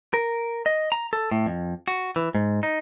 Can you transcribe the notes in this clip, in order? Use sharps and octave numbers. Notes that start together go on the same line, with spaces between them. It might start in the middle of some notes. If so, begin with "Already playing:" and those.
A#4
D#5
A#5
A4
A2
F2
F#4
E3
G#2
D#4